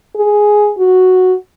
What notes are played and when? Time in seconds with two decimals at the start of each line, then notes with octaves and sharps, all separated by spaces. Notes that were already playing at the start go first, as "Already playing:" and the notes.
0.16 G#4
0.78 F#4